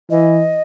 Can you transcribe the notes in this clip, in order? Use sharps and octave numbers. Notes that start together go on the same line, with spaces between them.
E3 D#5